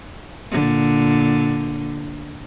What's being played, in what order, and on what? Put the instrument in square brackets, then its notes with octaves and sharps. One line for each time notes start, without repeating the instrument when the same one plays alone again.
[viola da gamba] A#2 D3